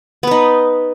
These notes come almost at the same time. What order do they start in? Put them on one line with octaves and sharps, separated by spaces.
B3 B4 D#4